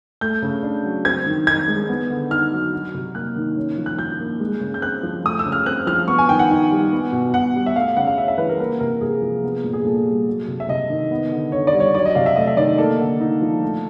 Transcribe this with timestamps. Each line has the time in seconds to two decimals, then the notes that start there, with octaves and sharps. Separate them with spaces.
0.21 A3 G6
0.42 C#3
0.63 D4
0.84 F#3
1.05 C4 G#6
1.26 D#3
1.47 D#4 G#6
1.68 G#3
1.88 B3
2.10 D3
2.31 D#4 F6
2.51 F#3
2.73 F#3
2.94 C3
3.15 A#3 F#6
3.36 D#3
3.57 C#4
3.78 F3
3.86 F#6
3.99 F3 G6
4.20 A#3
4.40 G#3
4.61 C#3
4.74 G6
4.82 C4 F#6
5.03 F3
5.24 A3 D#6
5.39 E6
5.46 C#3
5.52 F6
5.66 C4 F#6
5.87 F3 F6
6.08 B3 C#6
6.18 G#5
6.29 D#3 G5
6.39 F#5
6.50 D#4
6.71 G3
6.92 B3
7.12 B2
7.34 B2 F#5
7.55 G3
7.66 E5
7.76 A3 F5
7.97 C#3 F#5
8.07 F5
8.18 C#4 E5
8.28 E5
8.38 E3 B4
8.49 A#4
8.59 A#3 A#4
8.80 C3 A#4
9.01 C3 G#4
9.22 F3
9.44 B3
9.64 A#2
9.73 G#4
9.85 A#2 A4
10.06 G3
10.27 F#3
10.48 C3
10.60 E5
10.68 C3 D#5
10.90 D#3
11.11 B3
11.31 D3
11.52 D3 C#5
11.67 D5
11.73 G3
11.80 C#5
11.94 F#3 D5
12.05 D#5
12.15 C3 F5
12.26 E5
12.36 A3 D#5
12.47 E5
12.57 D#3 D5
12.78 A#3 A4
12.99 D3
13.20 D#4
13.42 F3
13.62 A3